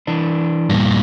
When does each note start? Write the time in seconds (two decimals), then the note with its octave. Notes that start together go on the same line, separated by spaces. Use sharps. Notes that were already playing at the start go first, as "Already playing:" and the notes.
0.07 E3 D4
0.69 G2 A#2